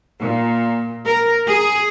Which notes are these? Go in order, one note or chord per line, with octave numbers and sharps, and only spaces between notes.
A#2
A#4
G#4